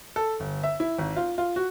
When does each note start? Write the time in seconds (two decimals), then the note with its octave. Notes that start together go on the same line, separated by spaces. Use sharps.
0.16 A4
0.40 G1
0.63 E5
0.80 E4
0.98 G#1
1.17 F4
1.38 F4
1.56 F#4